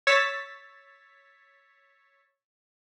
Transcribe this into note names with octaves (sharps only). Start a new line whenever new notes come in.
C#5 E6 A6 B6